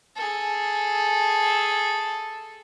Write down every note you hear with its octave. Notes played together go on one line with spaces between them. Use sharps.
G#4 A4